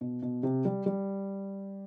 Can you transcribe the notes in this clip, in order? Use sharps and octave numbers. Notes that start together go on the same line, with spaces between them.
B2
B2
C3
G3
G3